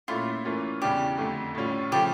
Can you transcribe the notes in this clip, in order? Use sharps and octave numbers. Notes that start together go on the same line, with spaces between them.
A#2 A3 C#4 E4 F4
A2 E3 A#3 C#4 F4
E2 C#3 E3 G3 D4 G4
F2 D3 A3
A2 G3 C#4 F4
C#3 F3 A3 G4